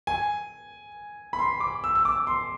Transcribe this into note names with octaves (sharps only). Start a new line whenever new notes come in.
G#5
B5
C6
D6
E6
E6
D6
C6